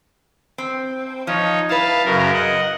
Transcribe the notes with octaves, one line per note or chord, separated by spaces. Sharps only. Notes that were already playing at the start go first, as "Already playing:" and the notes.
C4
F3 D#4 C#5
E4 B4 F5 A5
F#2 C#3 A#4
D#5 F#5